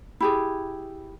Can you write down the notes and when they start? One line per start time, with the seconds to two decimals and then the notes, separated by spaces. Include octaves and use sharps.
0.20 E4 G4 G#4